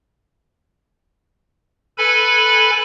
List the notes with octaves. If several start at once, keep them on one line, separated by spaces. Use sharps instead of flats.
A4 B4 G#5 B5